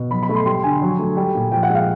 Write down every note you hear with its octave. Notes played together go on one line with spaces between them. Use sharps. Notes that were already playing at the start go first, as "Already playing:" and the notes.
Already playing: B2
F#3 B5
B5
A3
C6
G3 C6
D3 G#5
F#3
A3
G3
A#2
F3 G5
F#5
G#3
F5